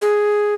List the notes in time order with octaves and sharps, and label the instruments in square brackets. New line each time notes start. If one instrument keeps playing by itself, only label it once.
[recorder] G#4